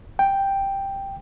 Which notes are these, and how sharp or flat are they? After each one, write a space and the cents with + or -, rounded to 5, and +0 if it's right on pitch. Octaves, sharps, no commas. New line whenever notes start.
G5 +0